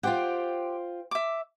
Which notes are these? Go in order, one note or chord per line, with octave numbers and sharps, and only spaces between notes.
F4 G4 C5 F#5 G5
E5 D6